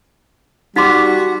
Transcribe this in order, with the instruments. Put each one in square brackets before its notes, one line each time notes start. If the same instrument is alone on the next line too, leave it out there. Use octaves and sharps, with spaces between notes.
[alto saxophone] G3 [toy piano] D#4 C6 [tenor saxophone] F#4 [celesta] D6 B6